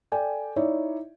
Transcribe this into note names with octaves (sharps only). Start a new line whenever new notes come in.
A4 D5 G5 G#5
D#4 E4 C#5 D5 E5